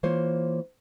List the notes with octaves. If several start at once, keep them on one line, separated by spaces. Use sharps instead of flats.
E3 A#3 F4 C5 C#5